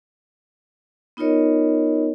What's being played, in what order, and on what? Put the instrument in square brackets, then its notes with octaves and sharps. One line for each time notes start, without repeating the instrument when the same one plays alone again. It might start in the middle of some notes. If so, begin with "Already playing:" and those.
[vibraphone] B3 D#4 F4 A#4 C#5 D#5